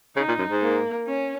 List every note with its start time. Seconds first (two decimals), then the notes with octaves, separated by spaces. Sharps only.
0.16 C#3 D#4
0.28 A#2
0.39 F#2
0.50 G#2
0.62 A#3
1.07 C#4